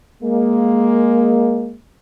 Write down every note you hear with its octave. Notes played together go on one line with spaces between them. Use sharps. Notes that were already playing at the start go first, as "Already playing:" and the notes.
G#3 A#3